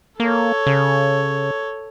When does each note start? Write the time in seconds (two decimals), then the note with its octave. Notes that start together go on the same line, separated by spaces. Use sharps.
0.20 A#3 A4 C#5
0.67 C#3